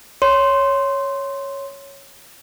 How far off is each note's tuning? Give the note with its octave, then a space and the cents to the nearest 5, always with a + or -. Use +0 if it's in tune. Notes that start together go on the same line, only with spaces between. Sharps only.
C#5 +0 C6 +0